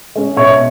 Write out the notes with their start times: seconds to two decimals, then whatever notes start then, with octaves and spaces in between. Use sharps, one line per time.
0.16 G#3 C#4
0.37 B2 C#5 E5